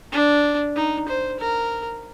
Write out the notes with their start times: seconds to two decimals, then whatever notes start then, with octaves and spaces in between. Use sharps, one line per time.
0.12 D4
0.76 D#4
1.08 C5
1.39 A#4